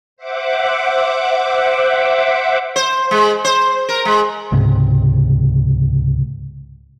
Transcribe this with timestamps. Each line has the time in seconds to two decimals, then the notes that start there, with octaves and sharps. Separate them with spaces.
0.17 C5 E5 F#5 D6
2.76 C5
3.11 G#3
3.44 C5
3.89 A#4
4.05 G#3
4.52 C#2 G#2 C3